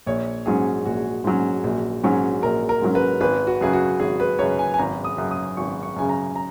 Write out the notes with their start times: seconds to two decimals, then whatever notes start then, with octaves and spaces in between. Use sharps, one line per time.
0.06 A#1 C#5
0.46 G#2 F#3 C#4 G#4
0.85 A#1 F#4
1.24 G#2 F#3 C#4
1.64 A#1
2.04 G#2 F#3 C#4
2.43 A#1 A#4
2.69 A#4
2.82 G#2 F#3 C#4
2.95 B4
3.21 G#1 B4
3.47 F#4
3.61 F#2 C#3 G#4
3.73 F#4
3.99 G#1 G#4
4.20 B4
4.39 F#2 C#3 C#5
4.59 G#5
4.74 G#5
4.78 G#1 A#5
5.04 D#6
5.17 F#2 C#3
5.31 D#6
5.57 G#1 C#6
5.83 C#6
5.96 F#2 C#3 G#5
6.09 A#5
6.36 A#5